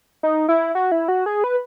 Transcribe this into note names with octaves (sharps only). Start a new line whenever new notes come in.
D#4
E4
F#4
E4
F#4
G#4
B4